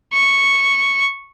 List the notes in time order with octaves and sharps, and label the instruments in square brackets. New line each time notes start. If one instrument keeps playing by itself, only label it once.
[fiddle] C#6